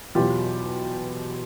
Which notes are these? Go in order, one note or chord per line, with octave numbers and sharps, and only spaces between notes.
E2 B2 F#3 F4 G4